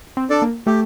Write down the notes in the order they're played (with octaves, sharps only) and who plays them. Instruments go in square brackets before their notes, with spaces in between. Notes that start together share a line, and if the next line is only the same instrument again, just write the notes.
[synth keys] C4
[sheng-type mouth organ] D4 A4 D5
[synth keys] A#3
[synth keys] A3 [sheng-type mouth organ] G4